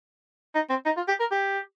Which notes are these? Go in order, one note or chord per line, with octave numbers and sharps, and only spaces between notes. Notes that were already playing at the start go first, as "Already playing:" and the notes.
D#4
C4
D#4
F4
G4
A#4
G4